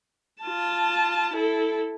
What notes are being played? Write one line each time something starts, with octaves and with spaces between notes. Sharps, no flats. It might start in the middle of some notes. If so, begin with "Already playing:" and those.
F4 A5
E4 A4